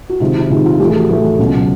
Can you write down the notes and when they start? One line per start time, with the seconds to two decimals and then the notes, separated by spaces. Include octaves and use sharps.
0.10 F#4
0.20 C3 D#3 G#3 F4
0.36 E4
0.50 C3 D#3 G#3 F4
0.66 F4
0.79 A2 G4
0.83 E3 A3
0.90 G#4
1.00 F#4
1.10 A2 E3 A3
1.39 C#2 B2 F#3